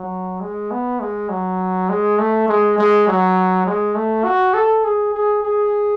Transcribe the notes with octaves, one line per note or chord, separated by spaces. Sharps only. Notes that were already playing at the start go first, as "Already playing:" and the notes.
Already playing: F#3
G#3
B3
G#3
F#3
G#3
A3
G#3
G#3
F#3
G#3
A3
F#4
A4
G#4
G#4
G#4